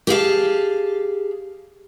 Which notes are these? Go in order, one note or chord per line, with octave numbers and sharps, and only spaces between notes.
G4 G#4 F5 A5